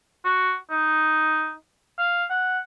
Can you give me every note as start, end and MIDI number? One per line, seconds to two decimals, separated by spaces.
0.25 0.55 66
0.70 1.53 63
1.99 2.25 77
2.30 2.59 78